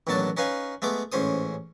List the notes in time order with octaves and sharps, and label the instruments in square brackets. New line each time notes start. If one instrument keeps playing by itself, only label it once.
[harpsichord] A1 D#2 B2 F#3 D4 A5
C#4 D#4 B4 F5 G#5
G#3 A3 B3 D6
A1 G#2 C#4 C5 D#6